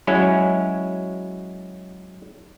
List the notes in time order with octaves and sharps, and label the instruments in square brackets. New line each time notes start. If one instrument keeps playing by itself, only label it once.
[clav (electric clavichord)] F#3 G#3 C#4 E4